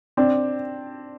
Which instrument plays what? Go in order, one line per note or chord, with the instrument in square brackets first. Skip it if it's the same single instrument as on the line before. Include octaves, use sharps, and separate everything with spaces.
[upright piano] C4 D4